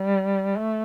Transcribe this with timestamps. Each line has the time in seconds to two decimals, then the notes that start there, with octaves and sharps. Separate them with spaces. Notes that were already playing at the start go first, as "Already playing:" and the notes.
Already playing: G3
0.58 A3